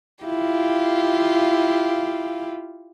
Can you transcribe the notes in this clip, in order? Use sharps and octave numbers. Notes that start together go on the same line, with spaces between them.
E4 F4 G4 F5